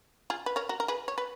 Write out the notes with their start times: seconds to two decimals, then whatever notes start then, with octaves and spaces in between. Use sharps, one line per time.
0.30 F4 G#4
0.46 B4
0.56 A#4 C#5
0.69 F#4 A#4
0.80 A#4
0.88 G#4 B4
1.08 C#5
1.18 B4